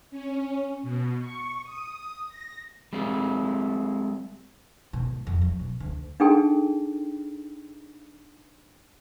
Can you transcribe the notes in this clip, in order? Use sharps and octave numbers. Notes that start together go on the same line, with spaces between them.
C#4
B2
C#6
D#6
A#6
G3 G#3 C4
B2
G#2
F2
F#3
B2
D2
D4 D#4 G#4 A4 G5